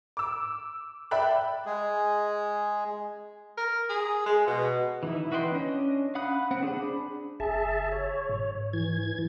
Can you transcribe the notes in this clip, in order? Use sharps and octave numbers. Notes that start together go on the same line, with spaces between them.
D6 E6
D5 E5 G5 B5 F#6
G#3 G#4
A#4
G#4
G#3
B2
E3 D#4 E4
F#4 B4 D#5 G5 C6
C#4 D4 D#5
F5 F#5 B5 D#6 F#6
C4 F#5
D4 G#4 C5 B5
F#1 G#4 E5 A5
C#5
G#2
E3 G#6